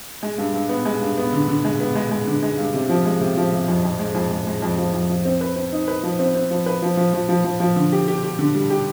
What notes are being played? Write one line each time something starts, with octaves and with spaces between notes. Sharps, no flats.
G#3
G2
G2
B3
G#3
G2
B3
D3
D3
G#3
B3
G#3
G#3
D3
G#3
G2
C3
F3
G#3
C3
F3
C3
F2
F2
G#3
F2
G#3
G#3
F2
F3
F2
F3
C4
B4
C4
D#4
B4
F3
C4
C4
F3
B4
F3
F3
F3
F3
F3
F3
D3
G4
G4
G4
D3
G3
G4